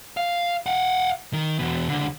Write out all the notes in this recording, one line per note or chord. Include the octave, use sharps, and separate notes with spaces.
F5
F5 F#5
D#3
E2 B2
C#2 D3